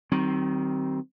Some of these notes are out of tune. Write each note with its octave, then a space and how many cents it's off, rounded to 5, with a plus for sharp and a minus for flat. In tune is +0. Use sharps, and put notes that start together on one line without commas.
D#3 +0 G3 -45 C4 +0